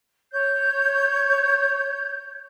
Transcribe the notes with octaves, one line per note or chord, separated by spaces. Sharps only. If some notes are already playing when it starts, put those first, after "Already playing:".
C#5 G6